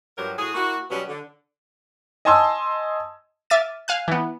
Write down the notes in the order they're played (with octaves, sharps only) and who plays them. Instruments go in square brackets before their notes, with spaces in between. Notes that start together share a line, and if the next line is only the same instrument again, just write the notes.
[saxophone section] G2 F3 F#3 G4 A#4
A2 F#4 G#4
A#3 E4 F#4
B2 F#3 G3 B3 C#4
D3
[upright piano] D#5 G#5 A5 C6 D#6 E6
[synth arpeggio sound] E5 D6 F6 A6 D#7
F5 G#5 F#6
E3 B3